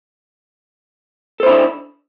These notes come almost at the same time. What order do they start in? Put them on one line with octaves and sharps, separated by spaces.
A4 C5 E4 D4